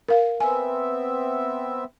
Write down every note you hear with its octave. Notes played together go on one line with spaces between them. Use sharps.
A#4 F5
B3 C4 E5 G#5